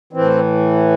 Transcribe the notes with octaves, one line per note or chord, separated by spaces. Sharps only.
A2 E3 C4